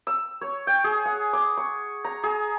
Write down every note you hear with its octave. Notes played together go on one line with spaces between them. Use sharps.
E6
C#5
G5
G#4
F#5
D6
C#6
A#5
G#4